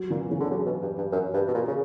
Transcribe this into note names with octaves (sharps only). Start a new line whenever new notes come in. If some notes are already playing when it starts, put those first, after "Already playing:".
Already playing: F#3
A#2 E3
C#3 E3
D3
C#3 F#3
B2
G2
G2
F#2
G2
B2
A#2
C#3